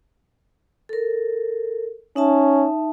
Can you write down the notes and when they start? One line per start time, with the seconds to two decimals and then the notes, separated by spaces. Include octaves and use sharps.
0.89 A4 A#4
2.16 C#4 D#4 E5 A5